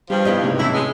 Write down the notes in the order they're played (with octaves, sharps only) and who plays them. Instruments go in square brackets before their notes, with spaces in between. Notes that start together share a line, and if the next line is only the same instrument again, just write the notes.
[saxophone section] G2 F3 [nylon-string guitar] G3 G4
[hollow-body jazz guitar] B3 E4 D#5 [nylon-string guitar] G4 D5
[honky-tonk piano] C#2 G#2 C3
[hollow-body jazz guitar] E2 A2 F#3 [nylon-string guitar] C#4 [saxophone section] E4
[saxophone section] G#3